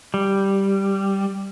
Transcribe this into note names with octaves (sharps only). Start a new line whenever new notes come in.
G3